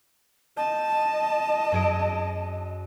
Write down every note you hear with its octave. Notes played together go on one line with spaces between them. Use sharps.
D#5 A5 G6
F#2 G#4 D7